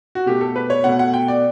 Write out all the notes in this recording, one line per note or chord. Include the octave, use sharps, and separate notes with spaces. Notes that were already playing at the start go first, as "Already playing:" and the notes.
F#4
B2 A3 G4
A4
B4
C#5
B2 A3 F#5
F#5
G5
D5